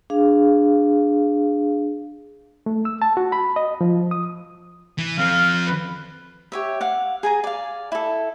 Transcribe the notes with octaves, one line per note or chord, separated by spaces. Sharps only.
D4 G#4 F5
A3
E6
A5
F#4
B5
D#5
F3
D#6
E3
F3 C4 F5
B4
G4 C#5 E5
F5 F#5
G#4 G#5 A#5
D5 F5
E4 A4